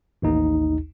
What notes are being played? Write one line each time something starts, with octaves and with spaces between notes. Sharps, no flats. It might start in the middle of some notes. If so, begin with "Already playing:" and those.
A1 D#2 D#4